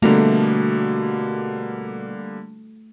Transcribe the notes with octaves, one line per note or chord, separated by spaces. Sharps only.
B2 D3 G3 A3 A#3 A#5